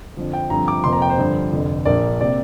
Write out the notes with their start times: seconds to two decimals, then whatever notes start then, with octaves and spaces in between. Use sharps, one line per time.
0.17 F2 D3 F3
0.33 G5
0.50 G2 D3 F3 C4 A#5
0.68 D6
0.84 F1 F2 F3 A#3 C6
0.93 A#5
1.02 G5
1.10 C5
1.18 G2 D3 F3
1.52 F1 F2 D3
1.85 A#1 A#2 A#3 D4 D5
2.21 C3 A#3 D5